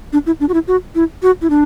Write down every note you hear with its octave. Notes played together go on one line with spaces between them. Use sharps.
D4
E4
D4
F#4
E4
F#4
E4
F#4
E4
D4